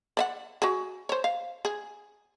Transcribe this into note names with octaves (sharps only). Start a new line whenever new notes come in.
D5 E5 F#5
F#4 G#4
C5 C#5
F5
G#4